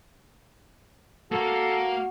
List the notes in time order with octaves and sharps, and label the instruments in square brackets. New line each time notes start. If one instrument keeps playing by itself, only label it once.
[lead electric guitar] A#3 A#4 [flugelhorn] F#4 [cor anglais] A4